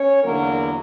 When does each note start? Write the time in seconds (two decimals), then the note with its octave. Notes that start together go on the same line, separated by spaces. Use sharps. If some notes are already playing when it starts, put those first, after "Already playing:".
Already playing: C#4 C#5
0.24 E2 D3 F#3 A#3 A#4